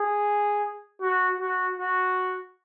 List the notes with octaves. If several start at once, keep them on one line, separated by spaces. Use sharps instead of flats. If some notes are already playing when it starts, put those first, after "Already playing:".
Already playing: G#4
F#4
F#4
F#4